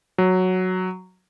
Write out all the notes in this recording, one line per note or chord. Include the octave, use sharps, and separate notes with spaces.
F#3